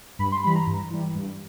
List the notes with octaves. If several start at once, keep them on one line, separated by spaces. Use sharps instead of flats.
G2 B5
C6
E3 G3 B5
A#5
G2
E3 G3
G2